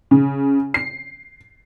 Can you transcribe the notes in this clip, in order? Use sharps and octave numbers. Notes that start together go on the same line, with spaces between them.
C#3
C7